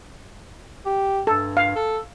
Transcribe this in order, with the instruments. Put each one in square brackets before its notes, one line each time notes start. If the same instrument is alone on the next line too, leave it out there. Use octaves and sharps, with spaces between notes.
[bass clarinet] G4
[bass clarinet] G2 [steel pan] A4
[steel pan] F5
[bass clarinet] A4